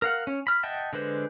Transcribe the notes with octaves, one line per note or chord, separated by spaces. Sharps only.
A#4 F5 F#5
C#4
B5 F6
D#5 E5 F#5 G5 A5
D3 G#3 B4 C5